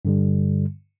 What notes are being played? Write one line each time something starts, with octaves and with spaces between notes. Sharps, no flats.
G2 D3 G3